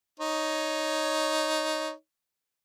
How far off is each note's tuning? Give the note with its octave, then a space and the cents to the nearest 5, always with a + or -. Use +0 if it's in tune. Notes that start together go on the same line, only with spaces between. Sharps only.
D#4 +0 C#5 +0